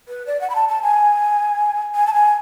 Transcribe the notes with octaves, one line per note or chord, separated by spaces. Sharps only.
B4
D5
F#5
B5
A5
A5
G#5
G#5
A5
G#5